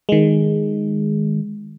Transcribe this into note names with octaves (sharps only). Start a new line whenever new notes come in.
D#3 G#3